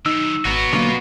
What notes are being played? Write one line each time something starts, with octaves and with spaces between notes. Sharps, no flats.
F#2 D#3 D#4 E6
G#1 B3 F#4 C#5 A#5
D3 F#3 A#3 F4